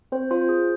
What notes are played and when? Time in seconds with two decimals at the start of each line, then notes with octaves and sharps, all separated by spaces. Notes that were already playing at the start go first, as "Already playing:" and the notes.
0.12 C4 C5
0.31 F4 C5
0.49 G#4